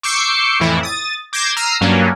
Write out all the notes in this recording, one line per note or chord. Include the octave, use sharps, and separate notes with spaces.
C#6 D6 E6 G6 C7 C#7
F2 A2 E3 E4
D#6 A6
D6 G6 G#6 A#6 C7 E7
A#5 E6 F6 C7 D#7
G2 F#3 A#3 C#4 D4